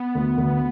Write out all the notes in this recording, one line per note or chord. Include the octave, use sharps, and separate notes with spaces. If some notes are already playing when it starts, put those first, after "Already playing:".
Already playing: B3
D2
D2